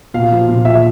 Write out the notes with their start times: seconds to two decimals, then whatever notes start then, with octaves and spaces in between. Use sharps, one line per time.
0.14 A#2 F5
0.32 F3
0.49 A#2
0.65 F3 E5